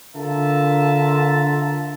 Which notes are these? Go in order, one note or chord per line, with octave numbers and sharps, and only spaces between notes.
D3 F4 A#4 E5 A5 A#5